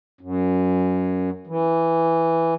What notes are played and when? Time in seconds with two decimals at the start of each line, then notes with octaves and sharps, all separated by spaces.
0.21 F#2
1.47 E3